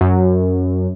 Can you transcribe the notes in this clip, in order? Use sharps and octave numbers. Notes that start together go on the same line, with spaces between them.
F#2